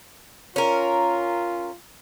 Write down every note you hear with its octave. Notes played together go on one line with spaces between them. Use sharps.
C#4 F4 A#4